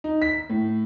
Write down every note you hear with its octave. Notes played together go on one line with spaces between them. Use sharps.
D#4
B6
A2